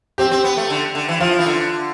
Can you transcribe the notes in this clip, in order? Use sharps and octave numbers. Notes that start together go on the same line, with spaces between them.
C4 G4
C4
B3
A3
D3
D3
E3
F3 F4
E3
D3